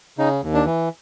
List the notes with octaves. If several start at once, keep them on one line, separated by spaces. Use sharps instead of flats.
C#3 D#4
D#2
D4
E3